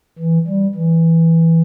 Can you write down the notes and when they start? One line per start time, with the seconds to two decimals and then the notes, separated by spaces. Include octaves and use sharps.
0.19 E3
0.47 G3
0.75 E3